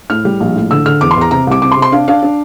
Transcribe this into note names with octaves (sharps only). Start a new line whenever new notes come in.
A2 F6
G3
A#1
A2
D3 E6
D3 F6
E2 D6
C6
E2 A#5
C3 A#5
C2 D6
C3 D6
C6
C3
C6
D4 F5
D4 F5
D4